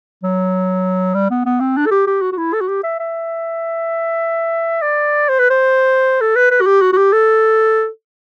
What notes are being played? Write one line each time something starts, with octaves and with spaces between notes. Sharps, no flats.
F#3
G3
B3
B3
C4
D4
A4
G4
G4
F#4
F#4
E4
A4
F#4
G4
E5
E5
D5
C5
B4
C5
A4
B4
B4
F#4
G4
F#4
F#4
G4
A4